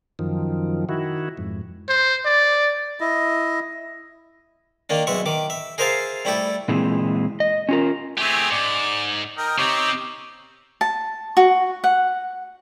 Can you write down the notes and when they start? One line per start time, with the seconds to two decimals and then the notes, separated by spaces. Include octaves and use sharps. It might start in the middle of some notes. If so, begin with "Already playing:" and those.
0.19 F#2 D#3 F3
0.89 D#3 E4 F#4
1.37 F2 G#2
1.89 C5
2.25 D5
3.00 E4 D#5
4.90 D#3 A#3 D4
5.07 B1 G#3 E5 C#6
5.26 D#3 D6
5.50 E5
5.78 G#4 A#4 C5 E5 F5 A5
6.25 G3 A3 E4 G4 A4
6.68 A#2 E3 G#3 C4
7.40 D#5
7.69 C#4 F4 A#4
8.18 A3 C4 G4 G#4 G#5
8.51 G#2 D5
9.38 A#4 D#5 G5
9.59 C3 C4 D#4 G4 C#5
10.81 A5
11.37 F#4
11.84 F#5